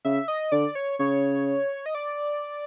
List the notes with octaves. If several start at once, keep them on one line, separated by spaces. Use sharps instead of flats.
C#3 E5
D#5
D3 D5
C#5
C#3 C#5
D#5
D5